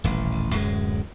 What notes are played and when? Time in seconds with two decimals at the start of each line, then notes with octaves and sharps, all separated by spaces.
0.04 D#1 A1
0.53 D1 F#2 G#3